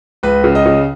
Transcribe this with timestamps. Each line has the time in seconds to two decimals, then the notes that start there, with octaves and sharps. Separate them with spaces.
0.23 C#2 B4
0.44 C#3
0.55 D#5
0.66 C#3